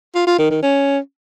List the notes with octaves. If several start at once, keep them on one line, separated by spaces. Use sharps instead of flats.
F4
F4
D#3
D#3
C#4